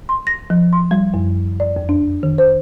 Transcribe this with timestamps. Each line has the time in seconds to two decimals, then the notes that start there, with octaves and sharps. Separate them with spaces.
0.09 C6
0.27 A#6
0.50 F3
0.73 C6
0.91 G3
1.14 F#2
1.60 D5
1.76 F2
1.89 D4
2.23 D#3
2.38 C5